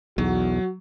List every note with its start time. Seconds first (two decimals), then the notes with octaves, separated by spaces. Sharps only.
0.18 B1 E2 F#3 F#4